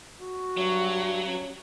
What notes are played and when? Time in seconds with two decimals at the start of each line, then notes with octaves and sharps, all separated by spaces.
0.22 F#4
0.57 G2 F#3
1.26 C#4